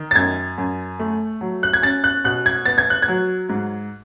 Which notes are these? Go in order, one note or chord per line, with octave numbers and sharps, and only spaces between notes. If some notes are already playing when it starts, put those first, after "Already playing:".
Already playing: D#3
A6
F#2 G#6
F#2
A3
F#3
F#6
G#6
C#4 A6
F#6
B2 F#6
G#6
B3 A6
G#6
F#6
G#6
F#3
G#2